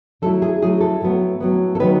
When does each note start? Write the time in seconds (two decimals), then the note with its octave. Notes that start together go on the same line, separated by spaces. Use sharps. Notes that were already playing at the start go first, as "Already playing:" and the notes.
0.22 F#3 A3 E4 A4
0.42 G#4
0.62 F#3 A3 E4 G#4
0.81 A4
1.00 A2 F#3 B3
1.40 A2 F#3 B3
1.75 A4
1.80 D#3 F#3 B3 B4